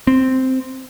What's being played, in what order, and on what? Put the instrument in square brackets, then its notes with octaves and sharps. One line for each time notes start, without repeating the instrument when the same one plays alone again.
[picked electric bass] C4